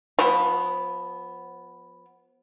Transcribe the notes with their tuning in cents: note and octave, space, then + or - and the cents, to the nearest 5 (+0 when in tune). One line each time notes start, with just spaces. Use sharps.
F3 +30 B3 +0